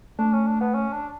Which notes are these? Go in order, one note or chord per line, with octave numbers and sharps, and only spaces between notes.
A3 D4
C#4
D4
B3
C#4
D4